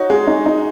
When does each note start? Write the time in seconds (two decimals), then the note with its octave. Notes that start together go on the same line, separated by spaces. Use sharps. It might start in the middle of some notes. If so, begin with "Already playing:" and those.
Already playing: D#4 F#4 C#5
0.10 G#3 G#4
0.27 D#4
0.46 D#4